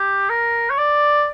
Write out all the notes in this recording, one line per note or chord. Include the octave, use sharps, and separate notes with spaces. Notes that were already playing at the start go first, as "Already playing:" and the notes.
Already playing: G4
A#4
C#5
D5